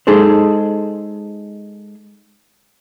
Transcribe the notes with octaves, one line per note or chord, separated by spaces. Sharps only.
G#3 D#4 G#4 A4 C5